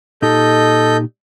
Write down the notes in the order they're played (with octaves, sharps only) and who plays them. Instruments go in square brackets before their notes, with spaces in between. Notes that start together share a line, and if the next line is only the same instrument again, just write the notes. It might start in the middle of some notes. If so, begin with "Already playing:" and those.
[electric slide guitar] A#2 D#4 G4 [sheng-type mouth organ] A4 D#5 G6